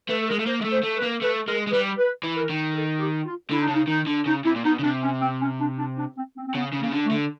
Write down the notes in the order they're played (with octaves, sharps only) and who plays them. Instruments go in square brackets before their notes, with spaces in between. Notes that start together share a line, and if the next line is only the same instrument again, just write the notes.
[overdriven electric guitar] A3 [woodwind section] B4
[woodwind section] A4
A#4
[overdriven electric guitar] G#3
A3
[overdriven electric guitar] A#3 [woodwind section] C5
[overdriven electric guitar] G#3
A3
[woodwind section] C5
[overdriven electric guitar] A3
[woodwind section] B4
[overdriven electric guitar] A#3
[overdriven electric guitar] A3 [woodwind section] B4
[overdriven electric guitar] G#3 [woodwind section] A#4
[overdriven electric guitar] G#3
[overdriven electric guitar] G3 [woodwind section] B4
[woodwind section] B4
[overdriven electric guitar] E3
[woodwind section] A#4
[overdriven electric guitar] D#3
[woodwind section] A4
G4
F4
[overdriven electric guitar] D3 [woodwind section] E4
[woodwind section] D#4
[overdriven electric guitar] C#3 [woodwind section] D4
[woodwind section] D#4
[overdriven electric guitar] D#3 [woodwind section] D#4
[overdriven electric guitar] D3
[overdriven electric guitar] C#3 [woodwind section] D#4
[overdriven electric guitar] C3 [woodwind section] E4
[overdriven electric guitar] A#2
[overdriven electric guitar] B2 [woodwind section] D#4
[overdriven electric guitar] C#3
[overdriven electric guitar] C3 [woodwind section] D4
[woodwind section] C#4
C4
C#4
D4
D4
D4
C4
C4
C4
[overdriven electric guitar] C#3 [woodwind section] B3
[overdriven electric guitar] C#3
[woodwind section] A#3
[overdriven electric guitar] C#3
D3
[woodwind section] A3
[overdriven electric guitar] D3